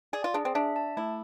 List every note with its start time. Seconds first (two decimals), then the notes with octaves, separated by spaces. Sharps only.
0.13 G#4 D5
0.24 F4
0.34 D4 G#4
0.45 C4
0.55 D4 E5
0.76 A5
0.97 A3 E4